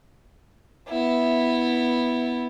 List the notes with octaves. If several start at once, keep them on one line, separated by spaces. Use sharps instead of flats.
B3 E4